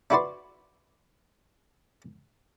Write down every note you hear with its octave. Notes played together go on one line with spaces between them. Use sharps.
D4 E4 F#4 B4 D5 C6